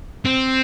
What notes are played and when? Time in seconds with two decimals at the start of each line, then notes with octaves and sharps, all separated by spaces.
0.25 C4